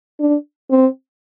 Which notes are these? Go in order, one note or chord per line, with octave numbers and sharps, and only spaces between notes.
D4
C4